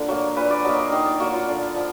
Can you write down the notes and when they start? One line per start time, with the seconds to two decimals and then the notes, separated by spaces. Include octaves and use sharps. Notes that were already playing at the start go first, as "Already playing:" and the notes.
Already playing: A#2 D3 A#4
0.08 F#3 A#3
0.36 A#2 B4
0.50 D5
0.65 F#3 A#3 D#5
0.78 F5
0.92 D#3 D#5
1.06 D5
1.20 F#3 A#3 F#4
1.34 F4
1.48 D3
1.76 F3